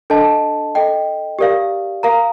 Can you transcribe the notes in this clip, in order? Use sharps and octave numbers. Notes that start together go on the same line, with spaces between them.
D4 A4 D#5 A5
A4 D#5 G5
G4 A#4 D5 F5
A#4 F5 A#5